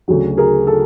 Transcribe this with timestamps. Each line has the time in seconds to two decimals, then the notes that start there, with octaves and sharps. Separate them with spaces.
0.08 D2 C#3 F#3
0.37 G#4 A#4
0.67 A4